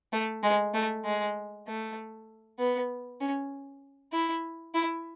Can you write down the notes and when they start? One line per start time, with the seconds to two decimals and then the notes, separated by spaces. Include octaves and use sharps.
0.13 A3
0.43 G#3
0.74 A3
1.05 G#3
1.67 A3
2.59 B3
3.20 C#4
4.12 E4
4.74 E4